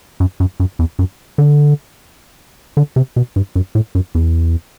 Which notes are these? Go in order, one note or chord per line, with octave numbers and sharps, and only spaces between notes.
F#2
F#2
F#2
E2
F#2
D3
D3
C3
B2
G2
F#2
A2
F#2
E2